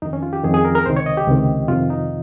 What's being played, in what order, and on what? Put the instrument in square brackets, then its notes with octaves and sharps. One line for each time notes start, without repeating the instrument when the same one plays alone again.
[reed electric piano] F2 D#3 D#4
C#4
F4
G4
F2 D#3 G#4
G#4
A#4
A#4
C#2 C3 D#3 C5
C#5
D#5
G4
C#2 C3 D#3
F2 C3 D#3 F4
D#4